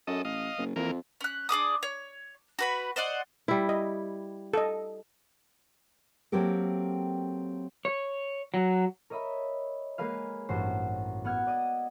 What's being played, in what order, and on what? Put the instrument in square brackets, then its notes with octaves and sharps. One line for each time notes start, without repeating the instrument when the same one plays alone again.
[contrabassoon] F#2 [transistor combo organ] A4 D#5
[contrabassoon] A1 [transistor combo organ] D#5 F5
[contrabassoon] F#1
[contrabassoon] F2 [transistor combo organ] E3 A#3 A#4
[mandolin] C#4 F#6
D4 G#4 D6 D#6
C#5
F#4 B4 B5
C5 D5 D#5 F#5
[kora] G3 E4
[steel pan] D#5
A4 D#5
[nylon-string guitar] F#3 A#3 C4 G4 A4 A#4
[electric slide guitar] C#5
F#3
[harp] A#4 C#5 D#5 E5 B5
G#3 A#3 G#4 A#4 B4 F5
A1 G2 F#4 C5
B3 F#5 F6 G#6
D5 D#5 D#6